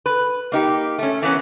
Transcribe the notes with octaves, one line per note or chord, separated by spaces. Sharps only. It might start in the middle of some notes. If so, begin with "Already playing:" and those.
B4
A#3 D#4 G4
A3 C#4
E3 A#3 B3 C#4